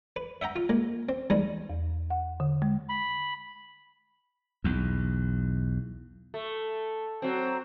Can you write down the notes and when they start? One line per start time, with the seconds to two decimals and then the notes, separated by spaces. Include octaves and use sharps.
0.16 B4
0.41 E5 F#5 G5 A#5
0.56 F4
0.69 G#3 A#3
1.09 C4
1.30 E2 G3 G#3 D#4
1.69 E2
2.10 F#5
2.40 D3
2.62 G#3
2.89 B5
4.64 B1 E2
6.34 A3
7.22 F#3 C4